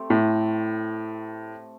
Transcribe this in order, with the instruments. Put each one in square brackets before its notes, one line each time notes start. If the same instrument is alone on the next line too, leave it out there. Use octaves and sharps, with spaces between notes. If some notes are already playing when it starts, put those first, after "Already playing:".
Already playing: [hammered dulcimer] A3 C4 G4
[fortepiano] A2